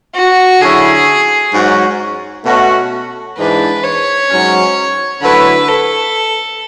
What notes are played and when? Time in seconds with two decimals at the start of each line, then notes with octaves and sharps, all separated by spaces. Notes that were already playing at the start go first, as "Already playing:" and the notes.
0.14 F#4
0.61 D3 F#3 C#4 E4 G#4
1.53 G#2 F#3 C#4 F#4
2.45 B2 A3 C#4 F#4
3.38 G#2 E3 G#3 D4 B4
3.84 C#5
4.30 G#2 F#3 C#4
5.22 D3 F#3 A3 E4 B4
5.68 A4